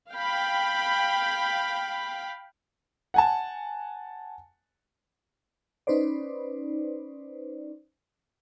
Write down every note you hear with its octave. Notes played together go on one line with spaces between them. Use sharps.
F5 G5 B5
F#5 G#5 A5
C#4 D#4 B4 C5 D5